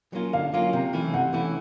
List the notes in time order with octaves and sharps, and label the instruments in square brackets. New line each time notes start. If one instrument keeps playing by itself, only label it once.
[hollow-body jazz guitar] F#3 A#3 C#4 F4
[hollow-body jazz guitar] D3 [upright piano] F5
[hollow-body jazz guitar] F#3 A#3 C#4 F4
C3
E3 A3 C#4 E4
[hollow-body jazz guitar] C3 [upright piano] F#5
[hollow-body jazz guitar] E3 A3 C#4 E4